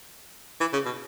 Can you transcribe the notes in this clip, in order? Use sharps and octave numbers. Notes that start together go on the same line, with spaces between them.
E3
C#3
B2